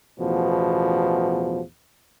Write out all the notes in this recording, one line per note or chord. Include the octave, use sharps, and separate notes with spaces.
A1 E2 B2 F3